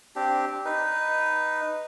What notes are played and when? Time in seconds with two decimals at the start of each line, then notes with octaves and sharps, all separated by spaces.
0.16 C4 D4 G4
0.65 D#4 B4